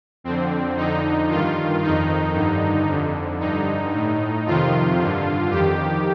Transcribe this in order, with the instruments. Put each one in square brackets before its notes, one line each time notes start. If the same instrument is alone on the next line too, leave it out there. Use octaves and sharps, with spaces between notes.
[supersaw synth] F2 D3 C4
F2 D3 D#4
G2 D#3 F4
F2 D#3 D#4
G2 D3
F2 D3
G2 D3 D#4
A2
F2 C3 D#3 F4
G2 D3
F2 D#3 G4